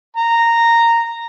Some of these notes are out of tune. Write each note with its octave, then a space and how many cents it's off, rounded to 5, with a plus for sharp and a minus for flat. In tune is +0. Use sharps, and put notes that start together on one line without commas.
A#5 -10